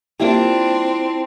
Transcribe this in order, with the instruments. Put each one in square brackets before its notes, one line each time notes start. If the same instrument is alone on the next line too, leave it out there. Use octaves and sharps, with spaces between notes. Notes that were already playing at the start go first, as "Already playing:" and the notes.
[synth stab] G3 A#3 [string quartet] C4 [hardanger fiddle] D4 [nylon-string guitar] E4 F4 E5